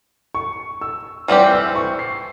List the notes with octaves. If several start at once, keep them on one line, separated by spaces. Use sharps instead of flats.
C#6
E6
E3 G3 C4 G4 F6
E6
C#6
C7